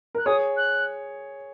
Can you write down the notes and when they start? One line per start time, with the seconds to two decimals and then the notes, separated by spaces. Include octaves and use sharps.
0.15 A#4 F#6
0.26 G#4 C#5 D#6
0.56 F#6